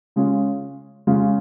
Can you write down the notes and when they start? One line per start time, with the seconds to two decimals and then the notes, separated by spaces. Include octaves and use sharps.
0.16 C#3 G#3 C#4 F4
1.07 C#3 G#3 C#4 F4